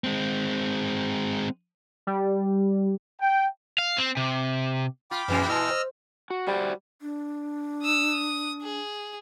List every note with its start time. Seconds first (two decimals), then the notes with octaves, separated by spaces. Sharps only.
0.04 G#3 C4
2.07 G3
3.21 G5
3.78 F5
3.98 C4
4.17 C3
5.11 F4 G5 B5 D6
5.28 F#2 A#2 E3 F3 G#3 C#4
5.49 E4 D#5 G#5 A5 E6 F6
5.70 C5
6.30 F#4
6.47 G3 F#4 C5 D5
7.02 D4
7.82 D#6 E6
8.11 D#6
8.62 G#4